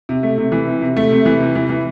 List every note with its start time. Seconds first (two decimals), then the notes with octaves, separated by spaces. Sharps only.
0.09 C3
0.23 A3
0.38 C3
0.52 E3
0.67 C3
0.81 C3
0.97 A3
1.11 C3
1.25 E3
1.40 C3
1.55 E3
1.69 E3